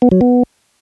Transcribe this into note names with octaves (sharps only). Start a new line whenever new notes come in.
B3
F#3
B3